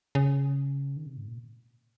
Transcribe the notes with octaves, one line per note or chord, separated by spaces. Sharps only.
C#3
D#3
C3
G#2
A#2